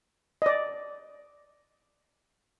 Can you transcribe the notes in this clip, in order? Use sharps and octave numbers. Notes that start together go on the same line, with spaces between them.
D5 D#5